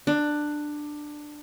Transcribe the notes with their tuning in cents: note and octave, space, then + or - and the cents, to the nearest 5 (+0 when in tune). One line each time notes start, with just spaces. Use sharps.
D4 +15